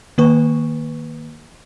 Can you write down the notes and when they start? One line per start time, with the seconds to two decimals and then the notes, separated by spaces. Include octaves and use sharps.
0.18 D#3 A#3 B4 C#6